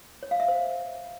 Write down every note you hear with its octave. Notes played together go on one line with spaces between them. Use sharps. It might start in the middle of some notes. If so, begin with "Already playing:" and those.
C#5
F5
E5
C5